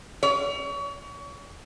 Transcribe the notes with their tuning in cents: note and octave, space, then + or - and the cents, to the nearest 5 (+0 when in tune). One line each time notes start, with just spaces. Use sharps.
C#5 +35